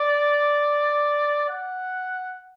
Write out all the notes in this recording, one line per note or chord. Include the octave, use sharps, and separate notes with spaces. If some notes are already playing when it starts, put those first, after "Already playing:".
Already playing: D5
F#5